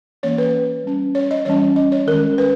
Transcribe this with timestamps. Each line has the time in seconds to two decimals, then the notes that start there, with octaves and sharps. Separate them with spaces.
0.23 E3 A#3 C#4 C#5
0.38 B4
0.84 G3 C#4
1.15 C#5
1.31 D#5
1.45 E3 G3 C#4 C#5
1.76 D#5
1.92 C#5
2.07 D#3 G#3 C#4 A#4
2.38 B4